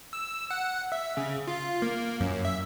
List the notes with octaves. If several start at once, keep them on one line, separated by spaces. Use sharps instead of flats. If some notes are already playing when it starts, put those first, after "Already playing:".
E6
F#5
E5
C#3
F4
A#3
F#2
E5